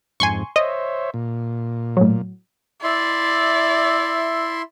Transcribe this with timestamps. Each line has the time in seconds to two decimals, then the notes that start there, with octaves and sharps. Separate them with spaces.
0.20 F2 G#2 G#5 C6 C#6
0.56 C5 C#5 D#5 E5
1.14 A#2
1.97 A2 F#3
2.83 E4 D5 E5 C6